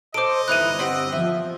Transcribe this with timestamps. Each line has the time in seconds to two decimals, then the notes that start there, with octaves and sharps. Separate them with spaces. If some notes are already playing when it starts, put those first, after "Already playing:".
0.14 A4 B4 C5 D#5 D6 D7
0.48 G1 E3 D#4 E4 F#6 D#7
0.79 C4 G4 F#5
1.12 F3 E5